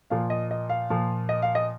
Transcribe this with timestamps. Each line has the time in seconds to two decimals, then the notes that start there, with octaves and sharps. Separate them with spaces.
0.10 A#2 F3 F5
0.30 D#5
0.51 D#5
0.69 F5
0.90 A#2 F3
1.29 D#5
1.42 F5
1.55 D#5